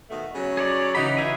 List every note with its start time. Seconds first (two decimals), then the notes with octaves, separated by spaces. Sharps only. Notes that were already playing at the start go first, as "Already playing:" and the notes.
0.10 B2 D#3 A3
0.34 C#3 F#3
0.57 G#4 C#5 D5
0.95 C#3 E3 F#3 D#4 B5
1.17 E3 D#4 E4 G#4 C#5 E5